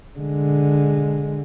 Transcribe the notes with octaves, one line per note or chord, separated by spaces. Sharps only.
D3 G#3